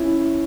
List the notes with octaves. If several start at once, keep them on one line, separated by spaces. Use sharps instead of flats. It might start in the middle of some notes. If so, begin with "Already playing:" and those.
Already playing: C#4 E4